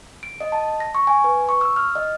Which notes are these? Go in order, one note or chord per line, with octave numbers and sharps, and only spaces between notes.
D7
D#5
A5
A#6
C#6
G#5
B4
C#6
E6
F6
D#5